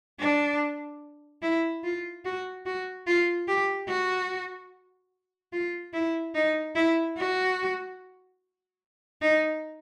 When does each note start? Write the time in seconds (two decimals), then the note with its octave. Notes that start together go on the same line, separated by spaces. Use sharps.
0.20 D4
1.43 E4
1.84 F4
2.25 F#4
2.66 F#4
3.07 F4
3.48 G4
3.88 F#4
5.53 F4
5.93 E4
6.35 D#4
6.75 E4
7.18 F#4
9.22 D#4